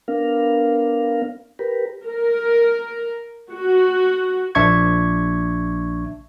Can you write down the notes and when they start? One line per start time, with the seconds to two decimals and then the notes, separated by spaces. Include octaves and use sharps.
0.08 B3 D4 A#4 F5
1.59 G4 A#4 B4
2.08 A#4
3.52 F#4
4.55 A#1 D4 E5 C#6 G#6